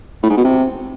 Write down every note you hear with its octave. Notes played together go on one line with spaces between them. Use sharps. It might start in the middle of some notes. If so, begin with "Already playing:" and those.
A2
G#2
B2
C3